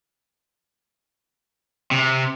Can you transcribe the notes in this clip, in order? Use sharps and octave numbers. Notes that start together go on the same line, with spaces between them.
C3